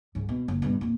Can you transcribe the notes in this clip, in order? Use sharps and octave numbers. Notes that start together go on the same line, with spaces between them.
C2 G#2
B2
F#1
G2 B2
F2 A#2